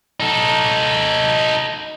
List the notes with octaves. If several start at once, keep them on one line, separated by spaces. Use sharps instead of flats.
D#4 A4